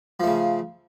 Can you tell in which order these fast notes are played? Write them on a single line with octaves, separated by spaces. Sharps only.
F3 A3 C#3